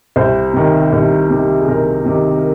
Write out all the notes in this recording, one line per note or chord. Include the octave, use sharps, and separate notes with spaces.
C2 C5
C3 D#3
C2
C3 D#3
G#4
C2 A#4
C3 D#3
A#4